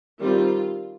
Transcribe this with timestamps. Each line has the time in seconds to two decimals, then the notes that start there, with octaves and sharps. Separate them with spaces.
0.19 D#3 G3 C4 F4